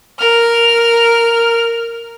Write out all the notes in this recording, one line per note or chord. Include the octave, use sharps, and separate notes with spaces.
A#4 F6